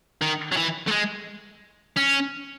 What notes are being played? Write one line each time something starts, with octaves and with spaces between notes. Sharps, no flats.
D#3
F#3
E3
A3
G#3
C#4